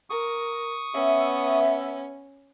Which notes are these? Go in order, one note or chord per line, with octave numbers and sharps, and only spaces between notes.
A#4 C#6 D#6
B3 C#4 E5